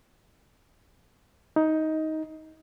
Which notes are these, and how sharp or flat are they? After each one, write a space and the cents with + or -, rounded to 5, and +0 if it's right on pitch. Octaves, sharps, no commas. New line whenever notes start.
D#4 +15